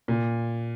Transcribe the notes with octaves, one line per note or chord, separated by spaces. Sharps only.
A#2